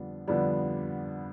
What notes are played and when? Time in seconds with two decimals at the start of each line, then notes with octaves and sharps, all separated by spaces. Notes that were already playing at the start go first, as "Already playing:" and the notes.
Already playing: F2 D3 G3 B3 D4
0.28 F2 D3 G3 B3 D4